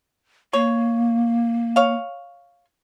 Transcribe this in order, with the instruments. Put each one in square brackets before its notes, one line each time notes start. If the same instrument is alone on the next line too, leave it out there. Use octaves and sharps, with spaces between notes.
[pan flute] A#3 [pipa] C#5
[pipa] C#5 F5